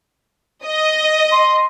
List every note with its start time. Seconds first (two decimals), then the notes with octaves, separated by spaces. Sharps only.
0.65 D#5
1.32 C6